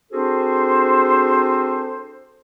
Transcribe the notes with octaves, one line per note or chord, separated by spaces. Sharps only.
C4 D4 F#4 G#4 A4 C5